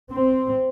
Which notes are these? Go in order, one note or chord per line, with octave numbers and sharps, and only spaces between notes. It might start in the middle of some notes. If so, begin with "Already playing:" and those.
C4